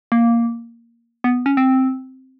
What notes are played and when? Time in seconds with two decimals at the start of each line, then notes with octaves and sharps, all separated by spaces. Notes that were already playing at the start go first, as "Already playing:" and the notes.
0.12 A#3
1.24 B3
1.46 C#4
1.57 C4